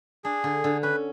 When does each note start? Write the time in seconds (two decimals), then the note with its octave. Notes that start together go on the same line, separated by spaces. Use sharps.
0.24 D4 G#4
0.44 D3
0.64 D3
0.83 C#4 B4